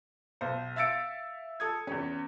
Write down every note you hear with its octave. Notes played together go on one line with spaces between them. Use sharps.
B1 C5
E5 F5 E6 A6 C#7 D7
A4 D#6 G#6
E2 C#4